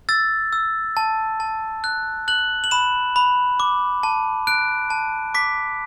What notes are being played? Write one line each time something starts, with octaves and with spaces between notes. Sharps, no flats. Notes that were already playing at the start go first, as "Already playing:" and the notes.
E6 A6
E6
A5
A5
F#6
F#6 F#7
F#7
B5 E7
B5
D6
A5
F#6 D7
A5
D6 B6